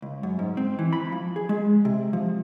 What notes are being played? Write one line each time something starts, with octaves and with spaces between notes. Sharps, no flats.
C#2
F#2
G#2
C4
E3
B5
F3
G#4
G#3
C3
F3